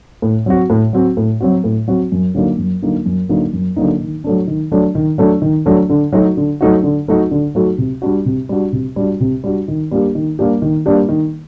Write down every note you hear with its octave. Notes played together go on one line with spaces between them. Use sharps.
A2
F#3 C4 F#4
A2
F#3 C4 F#4
A2
F#3 C4 F#4
A2
F#3 C4 F#4
F#2
D3 F#3 A#3 D#4
F#2
D3 F#3 A#3 D#4
F#2
D3 F#3 A#3 D#4
F#2
D3 F#3 A#3 D#4
D#3
F#3 A3 D4
D#3
F#3 A3 D4
D#3
F#3 A3 D4
D#3
F#3 A3 D4
D3
F#3 A3 D#4 F#4
D3
F#3 A3 D#4 F#4
D3
F#3 A3 D#4 F#4
D3
F#3 A3 D#4 F#4
C3
G3 D4 F#4
C3
G3 D4 F#4
C3
G3 D4 F#4
C3
G3 D4 F#4
D#3
G3 A#3 D4 G4
D#3
G3 A#3 D4 G4
D#3
G3 A#3 D4 G4
D#3